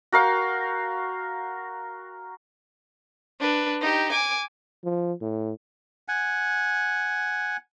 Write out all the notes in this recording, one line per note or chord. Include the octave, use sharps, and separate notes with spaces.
F#4 A#4 F5 G5
D4 B4
D#4 G4
G#5 D6
F3
A2
F#5 G#5